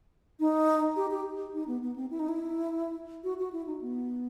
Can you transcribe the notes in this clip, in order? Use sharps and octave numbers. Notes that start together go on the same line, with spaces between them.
D#4
G4
G4
D#4
B3
B3
C4
E4
D#4
E4
F#4
F#4
E4
D#4
B3